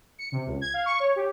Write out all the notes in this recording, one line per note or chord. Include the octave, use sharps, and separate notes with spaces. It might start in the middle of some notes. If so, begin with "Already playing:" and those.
C#7
C3
C#2
G#6
F5
C#6
C#5
G4